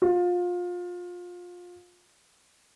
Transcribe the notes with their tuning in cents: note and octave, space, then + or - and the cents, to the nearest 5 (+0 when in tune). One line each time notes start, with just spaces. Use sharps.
F4 +25